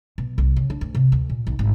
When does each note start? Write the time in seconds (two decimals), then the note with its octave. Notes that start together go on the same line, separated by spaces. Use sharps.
0.18 B2
0.38 C2
0.57 C#3
0.70 D4
0.81 D2
0.95 C3
1.12 D2
1.30 A#2
1.47 B1
1.59 G#1